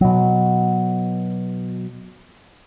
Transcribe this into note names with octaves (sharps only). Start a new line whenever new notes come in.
B2 F#3